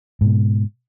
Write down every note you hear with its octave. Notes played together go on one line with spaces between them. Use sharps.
G#2 B2